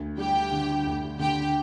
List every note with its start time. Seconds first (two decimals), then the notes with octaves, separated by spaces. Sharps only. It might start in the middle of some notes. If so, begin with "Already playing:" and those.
Already playing: D2
0.18 G3 G4 G5
0.52 D3
0.87 D2
1.19 D3 G4 G5